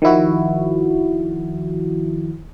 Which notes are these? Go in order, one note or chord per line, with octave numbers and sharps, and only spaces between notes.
D#3 F3 E4 F#4